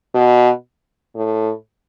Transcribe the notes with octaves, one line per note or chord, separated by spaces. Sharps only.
B2
A2